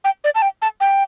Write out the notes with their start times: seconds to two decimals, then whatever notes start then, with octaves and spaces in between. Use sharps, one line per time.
0.04 G5
0.24 D5
0.35 A5
0.42 G5
0.62 A5
0.80 G5